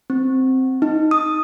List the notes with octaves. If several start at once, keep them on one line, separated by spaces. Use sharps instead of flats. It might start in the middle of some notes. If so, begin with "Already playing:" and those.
C4
D#4
D#6